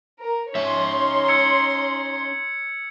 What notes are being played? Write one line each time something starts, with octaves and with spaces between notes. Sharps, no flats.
A#4
C#4 D#4 C#5 E5 C6
E6 G#6 C#7